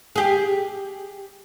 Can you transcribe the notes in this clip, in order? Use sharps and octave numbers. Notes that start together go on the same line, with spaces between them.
G4 G#4